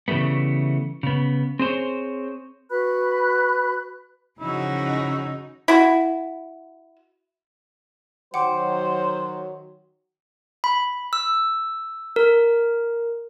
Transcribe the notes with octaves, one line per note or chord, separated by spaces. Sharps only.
C#3 E3 G3 A3 B3
C#3 B3
C4 G#4 C5 C#5
F#4 B4 B5 F#6
C#3 F3 D#4 E4 F#4
E4 F#4
D#3 F#3 C5 F#5 G5 D6
B5
E6
A#4